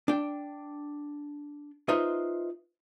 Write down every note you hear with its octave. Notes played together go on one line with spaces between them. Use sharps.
D4 G5
D#4 F4 B4 C5 D#5 E5